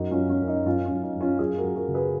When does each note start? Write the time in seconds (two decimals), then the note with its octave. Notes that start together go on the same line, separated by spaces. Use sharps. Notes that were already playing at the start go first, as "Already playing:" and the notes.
Already playing: F#2 D#4 F#4
0.11 C#4 F4
0.17 F#3
0.29 C#4
0.42 F#2
0.48 D#4
0.66 F#2 C#4 F4
0.85 C#4
0.91 F#2
1.02 D#4
1.15 F#2
1.21 C#4 F4
1.39 F#2 F4 G#4
1.57 F#4 A#4
1.63 F#2
1.76 F#4 A#4
1.88 C#3
1.94 G#4 B4